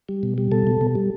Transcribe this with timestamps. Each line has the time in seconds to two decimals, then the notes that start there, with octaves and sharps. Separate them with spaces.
0.09 G3
0.23 B2
0.38 G3
0.52 B2 A4
0.67 B2
0.81 B2
0.95 G3